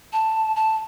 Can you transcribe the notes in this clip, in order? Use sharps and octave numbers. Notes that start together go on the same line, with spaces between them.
A5
A5